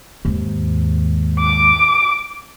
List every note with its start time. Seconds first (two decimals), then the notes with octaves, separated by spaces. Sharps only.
0.25 D#2 G#2
1.39 D6